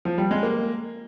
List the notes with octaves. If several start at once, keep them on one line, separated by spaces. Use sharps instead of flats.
F3
G3
G#3
A#3